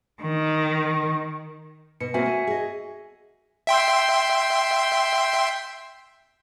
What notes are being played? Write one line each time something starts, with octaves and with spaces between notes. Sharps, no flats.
D#3
B2 C#7
A#3 C4 F#4 E5 G#5
A3 G#5
G#4 D#5
E5 G5 C6